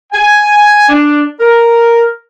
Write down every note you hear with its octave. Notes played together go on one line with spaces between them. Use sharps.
G#5
D4
A#4